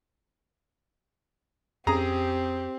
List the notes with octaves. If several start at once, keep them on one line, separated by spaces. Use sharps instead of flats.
F2 C4 C#4 G4 G#4 A#5